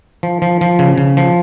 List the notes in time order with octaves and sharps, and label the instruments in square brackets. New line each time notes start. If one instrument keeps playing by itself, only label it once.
[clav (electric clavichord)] F3
F3
F3
C#3
C#3
F3